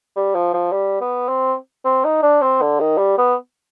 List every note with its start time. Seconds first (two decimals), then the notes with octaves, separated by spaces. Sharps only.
0.16 G3
0.35 F3
0.54 F3
0.72 G3
1.01 B3
1.29 C4
1.85 C4
2.05 D#4
2.23 D4
2.42 C4
2.61 D3
2.80 D#3
2.98 G3
3.18 B3